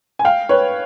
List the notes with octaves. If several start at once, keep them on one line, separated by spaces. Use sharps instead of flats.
G#5
F5 G5
B4 C#5